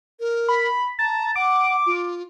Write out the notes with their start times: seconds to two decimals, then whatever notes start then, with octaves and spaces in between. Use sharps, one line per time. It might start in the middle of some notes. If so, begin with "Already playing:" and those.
0.20 A#4
0.49 B5
0.99 A5 A#5
1.36 F#5 D6
1.86 F4